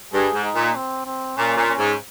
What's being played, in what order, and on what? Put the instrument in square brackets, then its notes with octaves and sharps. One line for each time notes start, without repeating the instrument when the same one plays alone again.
[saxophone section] G2 [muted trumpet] G#4
[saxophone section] G#2
[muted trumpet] D#4
[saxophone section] A#2
[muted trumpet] C4
C4
[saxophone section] A#2 [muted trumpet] C#4
[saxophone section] A#2
[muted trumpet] C#4
[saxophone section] G#2